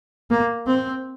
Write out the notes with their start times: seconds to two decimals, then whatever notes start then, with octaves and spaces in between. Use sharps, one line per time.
0.31 A#3
0.67 C4